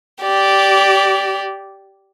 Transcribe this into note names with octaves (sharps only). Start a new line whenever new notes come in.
G4 D5